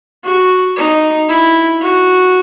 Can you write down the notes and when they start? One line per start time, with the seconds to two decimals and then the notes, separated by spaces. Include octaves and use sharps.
0.24 F#4
0.76 D#4
1.29 E4
1.81 F#4